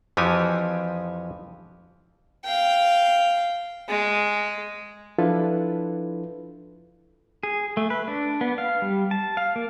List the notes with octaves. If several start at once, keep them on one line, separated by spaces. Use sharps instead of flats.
F2 E3 F3 F#4 G4 G#5
F5 G5
G#3
F3 D4 E4 F4 A4 B4
G#4
A3
B4
D4
B3
F5
G3
A5
F5
A#3